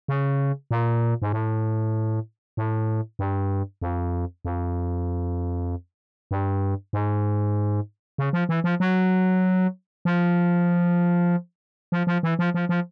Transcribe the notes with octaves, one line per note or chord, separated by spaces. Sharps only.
C#3
A#2
G#2
A2
A2
G2
F2
F2
G2
G#2
C#3
F3
E3
F3
F#3
F3
F3
F3
E3
F3
F3
F3